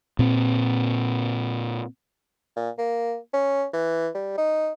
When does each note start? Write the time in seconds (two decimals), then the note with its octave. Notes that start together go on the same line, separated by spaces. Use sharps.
0.19 A#2 C4
2.57 A#2
2.78 A#3
3.33 C#4
3.73 E3
4.15 G3
4.38 D#4